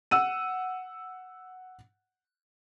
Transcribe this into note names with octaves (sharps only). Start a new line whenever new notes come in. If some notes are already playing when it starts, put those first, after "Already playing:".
F#5 E6 D#7